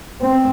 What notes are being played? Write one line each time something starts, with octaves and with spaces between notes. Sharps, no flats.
C4